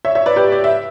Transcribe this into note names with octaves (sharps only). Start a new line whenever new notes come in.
C#5 E5
C#5 E5
B4 D5
G4 B4
D5
E5